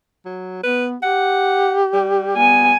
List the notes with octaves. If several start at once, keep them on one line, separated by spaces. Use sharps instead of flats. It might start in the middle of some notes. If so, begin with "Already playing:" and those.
F#3
B3 B4
G4 F#5
G3
B3 G#5